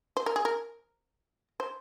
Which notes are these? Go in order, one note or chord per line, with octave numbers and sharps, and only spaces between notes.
C5
A#4
G#4
A#4
C5